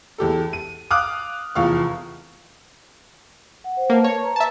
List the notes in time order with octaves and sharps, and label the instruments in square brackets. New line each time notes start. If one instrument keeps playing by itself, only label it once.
[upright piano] E2 G4 A4
D#7
F5 D6 D#6 F6 F#6
F1 E2 F3 F5 C#6
[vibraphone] F#5
C5
[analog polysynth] A#3 [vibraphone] B4 A5
[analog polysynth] C#5
[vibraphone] B4 A#5
[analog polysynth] E5 A5